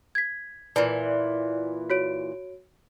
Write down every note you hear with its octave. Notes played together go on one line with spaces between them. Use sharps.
G#6 B6
A#2 E3 D5
F#4 C#5 D7